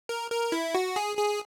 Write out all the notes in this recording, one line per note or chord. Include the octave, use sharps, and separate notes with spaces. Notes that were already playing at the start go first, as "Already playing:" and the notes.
A#4
A#4
E4
F#4
G#4
G#4